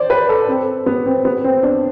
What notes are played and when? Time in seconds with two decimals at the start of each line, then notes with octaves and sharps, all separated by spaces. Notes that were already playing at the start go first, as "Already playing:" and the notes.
Already playing: C5 D5
0.10 B4
0.29 A4
0.48 C4
0.86 B3
1.06 C4
1.25 B3
1.44 C4
1.63 D4